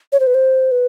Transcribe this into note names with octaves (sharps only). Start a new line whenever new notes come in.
C#5
C5
B4
C5
B4